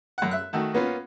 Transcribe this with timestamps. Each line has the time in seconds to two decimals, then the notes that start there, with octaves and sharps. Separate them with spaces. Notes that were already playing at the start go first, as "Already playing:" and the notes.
0.18 F#2 F#5
0.31 E5 F#6
0.53 D#3 A3 F#4
0.73 A#3 B3 C#4 F4